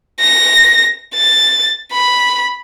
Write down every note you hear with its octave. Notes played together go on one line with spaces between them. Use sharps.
A#6
A6
B5